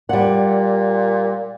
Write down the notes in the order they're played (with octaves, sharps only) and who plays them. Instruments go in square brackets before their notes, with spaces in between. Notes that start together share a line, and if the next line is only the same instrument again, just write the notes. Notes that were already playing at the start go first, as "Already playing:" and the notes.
[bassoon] A#2 [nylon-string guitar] G3 F#5